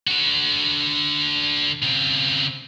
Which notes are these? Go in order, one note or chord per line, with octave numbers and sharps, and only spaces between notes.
D3 F#4
C#3 C4